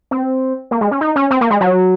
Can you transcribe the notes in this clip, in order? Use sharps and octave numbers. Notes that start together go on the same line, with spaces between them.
C4
A#3
G#3
C#4
D#4
C#4
C4
A#3
G#3
F#3